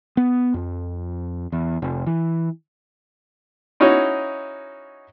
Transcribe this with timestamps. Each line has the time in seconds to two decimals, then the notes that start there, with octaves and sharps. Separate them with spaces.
0.17 B3
0.54 F2
1.52 E2
1.82 F1
2.06 E3
3.80 C#4 D#4 E4 F#4 C#5 D#5